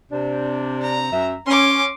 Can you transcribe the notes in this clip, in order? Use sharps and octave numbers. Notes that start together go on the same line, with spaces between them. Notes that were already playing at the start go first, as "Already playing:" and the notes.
C3 D4
A#5
F#2 E5
C#4 C6 D6